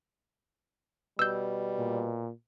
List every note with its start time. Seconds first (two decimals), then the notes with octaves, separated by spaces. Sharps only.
1.19 B2 G3 E6 G6
1.78 A#2